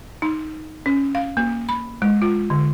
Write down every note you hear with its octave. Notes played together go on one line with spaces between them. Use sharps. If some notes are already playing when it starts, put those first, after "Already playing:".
D#4
C#4
F5
A#3
B5
G#3
F4
D3